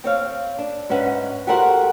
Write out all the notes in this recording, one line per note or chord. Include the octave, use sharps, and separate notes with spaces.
C4 C#5 F5
D4
G#2 C#4 B4 E5 F#5
F#4 G4 A4 A#4 C5 F#5